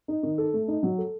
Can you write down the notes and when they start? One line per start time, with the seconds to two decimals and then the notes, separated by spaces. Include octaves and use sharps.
0.08 D#4
0.23 D#3
0.38 A4
0.54 A3
0.68 D#4
0.83 F#3
0.98 A4